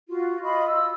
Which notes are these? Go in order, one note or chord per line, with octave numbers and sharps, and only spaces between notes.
F4 F#4
F4 D#5 B5
E6